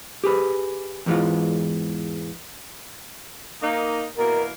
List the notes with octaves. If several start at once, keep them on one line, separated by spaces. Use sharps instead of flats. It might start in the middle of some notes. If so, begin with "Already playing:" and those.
G4 G#4 B4
E2 G#2 E3 G#3 D#4 F4
A#3 D#4
B2 E3 A#3 A#4